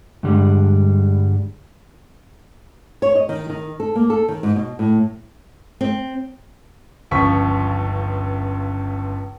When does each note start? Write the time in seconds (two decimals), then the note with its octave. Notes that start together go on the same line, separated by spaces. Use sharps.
0.23 G2 D3 G3 G#3
3.02 C#5
3.15 D#5
3.29 D#3
3.49 D#3
3.80 A4
3.95 A#3
4.10 A4
4.28 D#3
4.43 G#2
4.56 B2
4.79 A2
5.81 C4
7.11 G1 C#2 F3 C#6 B6